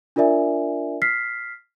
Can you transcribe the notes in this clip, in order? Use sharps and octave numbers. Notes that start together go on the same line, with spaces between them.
D4 F4 A#4 D5 E5 G#5
F6 B6 C7